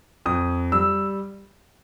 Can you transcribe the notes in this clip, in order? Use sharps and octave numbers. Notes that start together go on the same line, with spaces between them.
F2 D#6
G3 E6